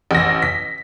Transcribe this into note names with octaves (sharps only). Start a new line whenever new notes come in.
A1 A#6
B6